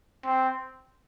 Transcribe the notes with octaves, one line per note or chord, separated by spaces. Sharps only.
C4